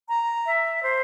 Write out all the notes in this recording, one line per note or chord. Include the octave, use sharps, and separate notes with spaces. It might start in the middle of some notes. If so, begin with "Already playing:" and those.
A#5
E5
C5